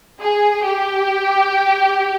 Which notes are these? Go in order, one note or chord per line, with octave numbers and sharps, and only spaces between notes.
G#4
G4